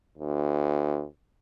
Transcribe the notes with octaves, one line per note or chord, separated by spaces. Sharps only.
D2